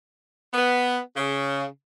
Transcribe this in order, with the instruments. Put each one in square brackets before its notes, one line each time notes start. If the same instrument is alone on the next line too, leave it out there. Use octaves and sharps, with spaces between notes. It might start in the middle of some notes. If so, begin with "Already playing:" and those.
[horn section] B3
C#3